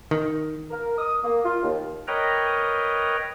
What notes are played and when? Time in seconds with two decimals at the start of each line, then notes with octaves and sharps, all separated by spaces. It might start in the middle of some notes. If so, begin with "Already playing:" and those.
0.11 D#3
0.71 A#4
0.98 D#6
1.24 A#3
1.44 F4
1.63 D#2
2.08 A#4 B4 C#5 D#5 G5 A#5